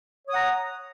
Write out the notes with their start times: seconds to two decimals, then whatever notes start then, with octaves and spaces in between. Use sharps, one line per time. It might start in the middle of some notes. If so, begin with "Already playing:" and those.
0.27 C#5
0.30 D#6
0.33 F#5
0.36 A#5